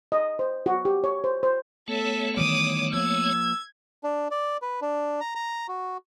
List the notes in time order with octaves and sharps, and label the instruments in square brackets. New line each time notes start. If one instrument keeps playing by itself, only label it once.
[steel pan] D#5
C5
F#4
G4
C#5
C5
C5
[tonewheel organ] A3 B3 C#5 [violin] A4 E5
[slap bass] D#3 E3 G3 [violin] D6 D#6
[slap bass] F3 A#3 [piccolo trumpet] E6 [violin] G#6
[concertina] D4
D5
B4
D4
A#5
A#5
F#4